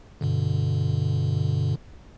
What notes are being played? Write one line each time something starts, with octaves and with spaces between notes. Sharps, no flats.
G2 B2 D3